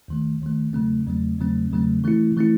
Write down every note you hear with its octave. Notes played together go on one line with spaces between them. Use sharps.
D#2 D#3 A3
D#2 D#3 A3
E2 C#3 F#3 A3 C4
E2 C#3 F#3 A3 C4
E2 C#3 F#3 A3 C4
E2 C#3 F#3 A3 C4
E3 A3 C4 E4
E3 A3 C4 E4